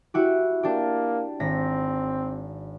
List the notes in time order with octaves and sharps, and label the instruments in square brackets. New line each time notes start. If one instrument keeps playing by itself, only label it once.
[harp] E4 F#4 G4
[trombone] A#3 [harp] D4 G4
[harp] G#1 A#6 B6 [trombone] C4